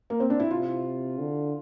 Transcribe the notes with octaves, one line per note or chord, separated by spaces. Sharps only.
A#3
C4
D4
E4
C3 F4
D3